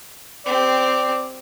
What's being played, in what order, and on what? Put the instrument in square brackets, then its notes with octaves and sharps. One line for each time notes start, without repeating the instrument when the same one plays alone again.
[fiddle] C4 G4 [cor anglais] D5